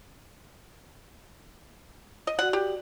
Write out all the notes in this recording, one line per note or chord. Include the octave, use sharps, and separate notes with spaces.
D#5
F#4 D5 F#5
G4